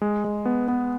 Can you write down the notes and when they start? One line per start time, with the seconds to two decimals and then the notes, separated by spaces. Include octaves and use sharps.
0.02 G#3
0.24 G#3
0.45 B3
0.68 B3